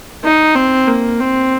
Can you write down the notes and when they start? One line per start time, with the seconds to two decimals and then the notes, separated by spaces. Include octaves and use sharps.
0.24 D#4
0.55 C4
0.88 A#3
1.20 C4